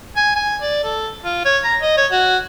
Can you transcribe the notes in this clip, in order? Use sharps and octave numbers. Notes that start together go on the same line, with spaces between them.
G#5
G#5
D5
A4
F4
C#5
A#5
D#5
C#5
F#4